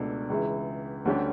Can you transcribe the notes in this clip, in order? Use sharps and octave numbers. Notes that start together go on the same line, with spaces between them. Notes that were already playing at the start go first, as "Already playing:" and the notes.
Already playing: C#2 B2 A3 D4 A4
C#2 C#3 E3
D2 D3 G3 C#4 G4